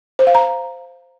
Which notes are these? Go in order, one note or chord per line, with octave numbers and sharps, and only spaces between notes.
C5
F5
A#5